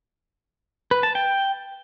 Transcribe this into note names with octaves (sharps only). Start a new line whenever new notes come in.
B4
A5
G5